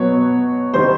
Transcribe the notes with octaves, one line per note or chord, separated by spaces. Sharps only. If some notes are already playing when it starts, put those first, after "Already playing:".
Already playing: B2 F#3 B3 C#5
C3 D#3 G3 C5